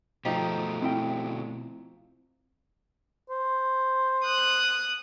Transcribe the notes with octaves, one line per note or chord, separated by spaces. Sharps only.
B2 F3 A3 D#4 G4
C4 E4 G5
C5
D#6 F#6